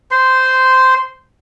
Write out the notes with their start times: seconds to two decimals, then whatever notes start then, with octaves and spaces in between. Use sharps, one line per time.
0.11 C5 C6